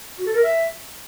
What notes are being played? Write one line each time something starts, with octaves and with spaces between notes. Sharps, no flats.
F#4
A4
A#4
E5